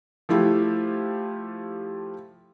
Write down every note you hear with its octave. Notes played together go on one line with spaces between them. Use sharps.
F3 A3 E4 F4 G4